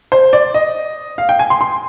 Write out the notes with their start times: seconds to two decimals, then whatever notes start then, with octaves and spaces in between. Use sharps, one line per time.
0.12 C5
0.33 D5
0.54 D#5
1.18 F5
1.29 G5
1.39 G#5
1.50 C6
1.61 C6